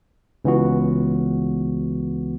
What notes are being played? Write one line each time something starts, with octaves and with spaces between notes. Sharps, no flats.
C#2 E3 B3 F#4